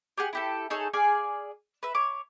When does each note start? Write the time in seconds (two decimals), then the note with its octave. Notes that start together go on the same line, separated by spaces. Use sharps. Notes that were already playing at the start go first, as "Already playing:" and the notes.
0.17 G4 G#4 F#5
0.33 E4 G4 A4
0.70 D#4 G#4 A4 C#5
0.93 G#4 D5 F5 G#5
1.83 B4 E5
1.95 C#5 D6